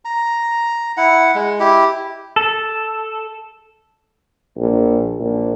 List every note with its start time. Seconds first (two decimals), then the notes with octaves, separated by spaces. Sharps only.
0.05 A#5
0.97 E4 F#5
1.35 G#3
1.60 E4 G4
2.36 A4
4.57 A#1
5.20 A#1